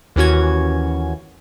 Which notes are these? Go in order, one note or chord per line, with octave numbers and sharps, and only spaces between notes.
D#2 E3 C#4 F#4 G#6